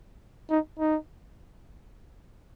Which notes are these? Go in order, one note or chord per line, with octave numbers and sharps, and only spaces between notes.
D#4
D#4